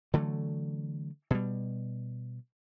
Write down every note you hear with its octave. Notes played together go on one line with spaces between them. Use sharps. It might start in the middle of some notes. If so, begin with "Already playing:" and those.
D3 E3 F#3 A3
B2 G3